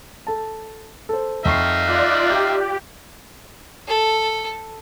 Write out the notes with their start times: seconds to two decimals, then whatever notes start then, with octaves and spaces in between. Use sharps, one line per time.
0.27 A4 A5
1.09 A4 C5
1.45 F2 D#4 E5 F5 C#6 C7
1.85 F4 D5 F#6
2.30 G4 G6
3.88 A4